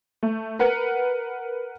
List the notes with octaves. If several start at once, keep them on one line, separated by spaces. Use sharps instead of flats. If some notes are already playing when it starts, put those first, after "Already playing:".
A3
A#4 B4 F#5